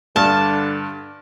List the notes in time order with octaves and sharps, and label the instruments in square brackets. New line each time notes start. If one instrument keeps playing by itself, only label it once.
[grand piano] G2 F6 [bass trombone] D3 [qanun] A5